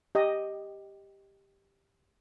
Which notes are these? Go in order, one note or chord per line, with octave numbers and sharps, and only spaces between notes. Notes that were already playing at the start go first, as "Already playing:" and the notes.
G4 D#5